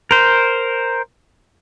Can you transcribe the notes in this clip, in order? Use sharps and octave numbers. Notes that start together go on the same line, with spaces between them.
A#4 C5